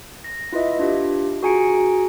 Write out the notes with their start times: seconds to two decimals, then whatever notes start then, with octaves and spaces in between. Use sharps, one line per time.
0.24 A#6
0.53 E4 F4 B4 D#5 E5
0.79 D4 F4 G4
1.43 F#4 G#4 G#5 A#5 C#7 D7